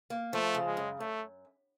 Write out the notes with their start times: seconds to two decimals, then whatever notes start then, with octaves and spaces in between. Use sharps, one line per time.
0.10 A#3
0.33 F3 A3
0.55 C#3
0.66 G#3
0.77 F#2
1.00 F#2 A3